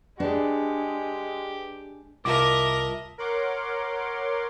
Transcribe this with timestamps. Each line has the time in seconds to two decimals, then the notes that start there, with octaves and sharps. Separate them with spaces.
0.20 G#3 D4 G4 G#4 B4
2.25 C2 F4 A#4 D#5 E5 A5 D6
3.18 A#4 C#5 F#5 C6 D6